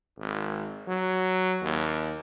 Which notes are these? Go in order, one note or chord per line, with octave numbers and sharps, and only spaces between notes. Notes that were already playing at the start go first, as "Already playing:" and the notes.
G#1
F#3
D#2